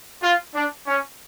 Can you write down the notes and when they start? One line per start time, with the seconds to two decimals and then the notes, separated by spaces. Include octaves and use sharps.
0.23 F4
0.54 D4
0.87 C#4